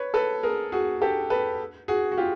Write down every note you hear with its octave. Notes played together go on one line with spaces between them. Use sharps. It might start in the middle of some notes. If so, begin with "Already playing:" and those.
Already playing: B4 C#5
A4 B4
G#4 A#4
F#4 G#4
G4 A4
A4 B4
F#4 G#4
F#4
F4 G4